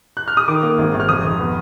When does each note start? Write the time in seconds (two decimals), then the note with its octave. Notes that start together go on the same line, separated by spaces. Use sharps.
0.17 F#6
0.28 F6
0.37 D#6
0.48 D#3 D6
0.63 A#3
0.78 G#1
0.94 G#1
1.00 F6
1.09 F1 D#6
1.24 F1
1.39 B3